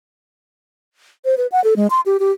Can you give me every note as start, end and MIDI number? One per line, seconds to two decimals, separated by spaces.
1.25 1.35 72
1.37 1.47 71
1.52 1.62 78
1.64 1.74 69
1.76 1.87 56
1.90 2.01 84
2.06 2.17 67
2.20 2.32 67